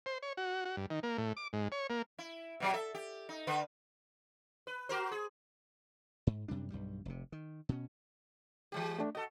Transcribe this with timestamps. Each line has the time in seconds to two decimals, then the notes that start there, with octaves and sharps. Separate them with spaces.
0.06 C5
0.22 C#5
0.37 F#4
0.65 F#4
0.77 G2
0.90 D#3
1.03 A#3
1.18 A2
1.37 D6
1.53 G#2
1.72 C#5
1.90 A#3
2.18 E4
2.60 B2 F#3 G4
2.73 A4 E5
2.95 G4
3.29 D#4
3.47 D3 B4
4.67 B4
4.89 F#4 A#4 C5
5.11 G#4
6.27 G#2
6.48 F#2 C3 G3 D4
6.70 B1 G2 G3
7.05 F1 C3
7.32 D#3
7.69 B2 C#4
8.72 E3 G#3 G4
8.99 A3 D4
9.15 F#4 A4 D#5